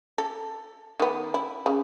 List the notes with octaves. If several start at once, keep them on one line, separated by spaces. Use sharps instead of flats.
A4
D#3 B3
E4
C#3